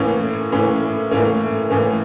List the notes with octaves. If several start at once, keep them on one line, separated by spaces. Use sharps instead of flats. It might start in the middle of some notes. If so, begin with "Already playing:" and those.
Already playing: A2 E3 A#3 C#4
A2 E3 A#3 C#4
A2 E3 A#3 C#4
A2 E3 A#3 C#4